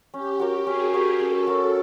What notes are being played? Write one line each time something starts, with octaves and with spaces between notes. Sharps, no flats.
C#4 G4
F#4 A#4 C#5
C#4 G#4
F#4 A#4 C#5
C#4 A4
F#4 A#4 C#5